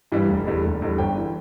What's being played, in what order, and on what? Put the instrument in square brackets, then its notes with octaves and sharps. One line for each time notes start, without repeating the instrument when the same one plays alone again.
[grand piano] G2 E3 G3
F1
E2 D3 G3
F1
E2 D3 G3
G1 G5
E3